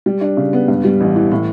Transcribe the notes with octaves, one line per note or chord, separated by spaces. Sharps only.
G3
D4
C#3
B3
G2
G3
A1
E3
A2